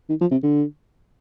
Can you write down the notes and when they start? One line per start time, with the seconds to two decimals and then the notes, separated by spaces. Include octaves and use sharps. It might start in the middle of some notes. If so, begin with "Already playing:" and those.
0.09 D#3
0.21 F3
0.31 C3
0.43 D3